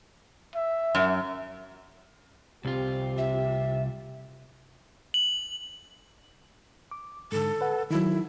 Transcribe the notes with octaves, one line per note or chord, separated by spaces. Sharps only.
E5
F#2
C2 C4 F4 G4
E5
F#7
D6
G#2 D3 A4
B4 F#5
D#3 F#3 E4